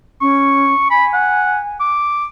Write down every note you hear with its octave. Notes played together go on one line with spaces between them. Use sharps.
C#4 C#6
G#5 B5
F#5
D6